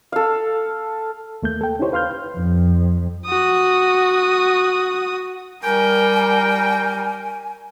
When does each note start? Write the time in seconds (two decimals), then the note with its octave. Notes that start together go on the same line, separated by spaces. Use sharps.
0.12 A4 F5
1.43 D#2 A3 A#3 G6
1.61 A4 G5
1.79 C#4 D#4 E4 G4 C5 C#5
1.92 B4 F5 C6 F6 G6
2.37 F2
3.26 F#4 D#6
5.64 G3 A#4 G5 G#5